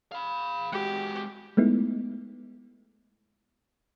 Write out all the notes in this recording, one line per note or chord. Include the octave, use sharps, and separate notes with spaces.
F5 B5
G#3 F#4 G4
G#3 A3 B3 D#4 E4